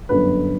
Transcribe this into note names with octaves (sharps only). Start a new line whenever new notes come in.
G1 F#2 D3 B4